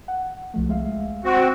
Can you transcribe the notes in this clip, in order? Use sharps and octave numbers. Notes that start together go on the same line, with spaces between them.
F#5
C2 F3 A3
G#3 E5 F5
C4 F#4